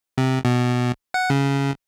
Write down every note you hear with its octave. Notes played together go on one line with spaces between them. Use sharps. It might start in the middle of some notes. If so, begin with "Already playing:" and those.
C3
B2
F#5
C#3